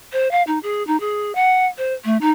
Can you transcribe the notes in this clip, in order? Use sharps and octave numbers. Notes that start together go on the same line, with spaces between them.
C5
F5
D#4
G#4
D#4
G#4
F#5
C5
A3
D#4